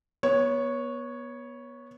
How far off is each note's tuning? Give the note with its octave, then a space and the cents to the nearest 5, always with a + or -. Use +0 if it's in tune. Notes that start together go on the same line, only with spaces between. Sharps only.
B3 -25 C#5 +0